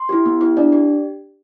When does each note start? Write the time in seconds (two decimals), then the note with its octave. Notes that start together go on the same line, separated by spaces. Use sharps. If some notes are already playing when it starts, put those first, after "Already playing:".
Already playing: C6
0.09 E4 G4
0.26 B3
0.41 E4 G4
0.57 D4 D5
0.72 G4